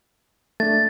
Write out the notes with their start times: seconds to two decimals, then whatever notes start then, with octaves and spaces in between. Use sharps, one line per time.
0.60 A3 D4 A6